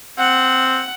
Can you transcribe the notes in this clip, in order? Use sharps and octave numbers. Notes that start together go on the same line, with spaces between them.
C4 F#5